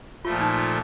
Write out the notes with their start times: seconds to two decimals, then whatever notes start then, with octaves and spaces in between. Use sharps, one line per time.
0.25 A#2 F3 A3 F4
0.41 D#4
0.58 D#4